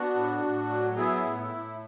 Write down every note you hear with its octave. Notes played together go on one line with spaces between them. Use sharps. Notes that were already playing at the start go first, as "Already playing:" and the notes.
Already playing: B3 D4 F#4
A2
A2
F#3
B3 E4 G#4
A2
E4
A2